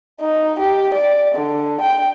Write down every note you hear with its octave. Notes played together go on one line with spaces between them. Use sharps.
D#4
G4
D5
D3
G5